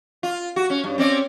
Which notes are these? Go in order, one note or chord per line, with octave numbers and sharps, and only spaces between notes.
F4
F#4
C#4
G2
C4 C#4 D5